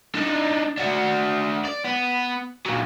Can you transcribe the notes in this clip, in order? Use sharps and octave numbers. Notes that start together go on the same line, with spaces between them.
D4 D#4
D4 F#4
D5
B3
A#2 F#3